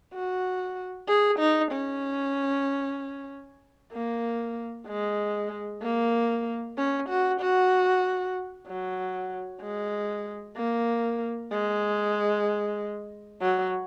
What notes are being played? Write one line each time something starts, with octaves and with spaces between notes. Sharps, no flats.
F#4
G#4
D#4
C#4
A#3
G#3
A#3
C#4
F#4
F#4
F#3
G#3
A#3
G#3
F#3